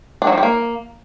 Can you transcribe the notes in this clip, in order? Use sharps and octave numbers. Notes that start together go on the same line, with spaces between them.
D4
F#3
F3
G3
A#3